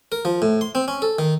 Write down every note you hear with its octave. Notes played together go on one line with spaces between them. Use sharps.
A#4
F3
A2
C6
C4
C#4
A4
D#3